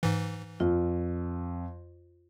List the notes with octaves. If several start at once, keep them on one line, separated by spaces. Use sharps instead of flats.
G#2 E3
F2 F4